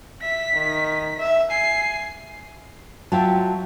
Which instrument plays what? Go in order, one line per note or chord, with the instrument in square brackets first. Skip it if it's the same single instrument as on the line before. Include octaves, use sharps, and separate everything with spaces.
[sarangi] E5 [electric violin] B6
[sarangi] D#3
E5
[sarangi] G#5 [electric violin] C7
[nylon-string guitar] F#3 F4 E5 [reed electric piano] G5 A5